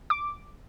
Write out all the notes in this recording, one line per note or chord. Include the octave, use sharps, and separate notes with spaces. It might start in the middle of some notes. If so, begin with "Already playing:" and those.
D6